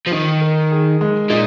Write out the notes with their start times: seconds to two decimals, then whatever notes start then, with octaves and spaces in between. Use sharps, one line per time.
0.06 F3
0.11 D#3 D#4
0.41 A#4
0.71 G#4
1.01 G#3
1.30 A#2 D#4